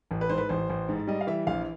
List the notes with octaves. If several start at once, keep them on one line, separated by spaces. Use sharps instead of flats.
A1
B4
G#2 C5
B4
A1 C5
A1
G#2
G3 D#5
F5
E3 E5
A#1 F5